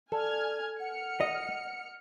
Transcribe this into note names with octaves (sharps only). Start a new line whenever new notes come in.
A4 D5 G#5 F6 G#6
F#5 F6 C#7
D#5